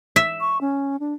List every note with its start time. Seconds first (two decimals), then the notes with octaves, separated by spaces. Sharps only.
0.16 E5
0.40 C#6
0.61 C#4
1.00 D4